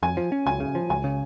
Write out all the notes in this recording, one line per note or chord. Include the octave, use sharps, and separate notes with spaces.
F2 G#5
F3
C#4
C#2 G#5
C#3
F3
C#2 G#5
C#3